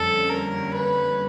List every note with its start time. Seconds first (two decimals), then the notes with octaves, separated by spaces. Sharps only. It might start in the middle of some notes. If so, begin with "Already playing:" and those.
Already playing: F2 D3 G3 A#3 C#4 A4
0.29 A#4
0.74 B4